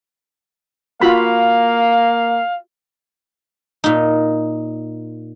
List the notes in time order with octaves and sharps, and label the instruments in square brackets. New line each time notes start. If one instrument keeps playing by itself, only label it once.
[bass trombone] A#3 [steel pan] F4 F#4 B5 [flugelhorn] F5
[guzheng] A#2 D#4